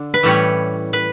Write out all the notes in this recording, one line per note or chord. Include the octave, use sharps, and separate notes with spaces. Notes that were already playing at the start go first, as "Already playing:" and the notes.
Already playing: D3 D4
B4
A2 E3 G3 C#4 C#5
B4